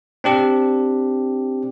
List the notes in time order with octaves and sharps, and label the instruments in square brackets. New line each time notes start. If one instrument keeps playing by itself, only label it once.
[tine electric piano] C4 D4 G4